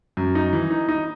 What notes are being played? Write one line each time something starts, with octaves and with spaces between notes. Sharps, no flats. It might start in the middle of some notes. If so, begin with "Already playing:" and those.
F#2
D#4
E3
D#4
D#4